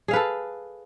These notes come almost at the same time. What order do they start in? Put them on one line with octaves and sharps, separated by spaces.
G#4 F5 B4 A4